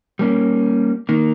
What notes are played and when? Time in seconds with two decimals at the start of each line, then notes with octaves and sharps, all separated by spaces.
0.19 G3 A#3 C#4
1.09 D#3 A#3